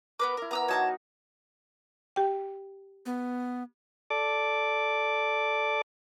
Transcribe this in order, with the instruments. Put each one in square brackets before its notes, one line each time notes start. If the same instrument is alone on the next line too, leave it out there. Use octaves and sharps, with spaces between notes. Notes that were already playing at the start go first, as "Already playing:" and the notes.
[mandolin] B3 B4 D6 [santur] A#4
[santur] E4 D6 [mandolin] A#4
[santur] B3 A#4 B4 [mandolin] A#5 D#6 E6
[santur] F#3 D#4 F#4 [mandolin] C#5 A5 A#5
[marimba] G4 G5
[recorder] B3
[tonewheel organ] A4 D5 D6